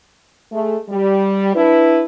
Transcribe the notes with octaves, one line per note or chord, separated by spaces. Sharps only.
G#3 A3
G3
D4 E4 B4